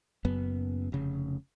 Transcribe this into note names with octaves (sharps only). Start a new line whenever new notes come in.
F#1 F#2 B3
F1 C#3